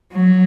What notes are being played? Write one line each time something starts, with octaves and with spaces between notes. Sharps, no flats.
F#3